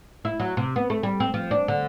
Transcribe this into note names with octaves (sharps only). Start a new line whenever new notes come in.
E4
F#3
C3
B3
A3
G3
C4
F3
D4
D3